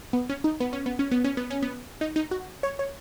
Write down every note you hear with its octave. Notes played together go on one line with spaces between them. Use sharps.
B3
C#4
D#4
B3
C#4
B3
C#4
B3
C#4
B3
C#4
B3
D#4
D#4
F#4
C#5
C#5